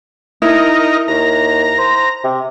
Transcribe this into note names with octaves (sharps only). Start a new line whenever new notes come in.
D#4 E4 A#4
D#2 A#5
C5
C3